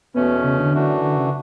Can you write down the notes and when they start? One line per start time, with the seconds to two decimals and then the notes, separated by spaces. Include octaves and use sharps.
0.14 E2 B2 A3 B3 C#4
0.44 C#3
0.58 D3
0.72 F#2 E3 A3 D4 F#4
1.01 D3
1.16 C#3